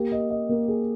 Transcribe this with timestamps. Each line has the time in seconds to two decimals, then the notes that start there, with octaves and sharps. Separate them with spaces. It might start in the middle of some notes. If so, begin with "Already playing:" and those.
Already playing: A#3 G4
0.12 D#5
0.30 D#5
0.49 A#3
0.68 G#4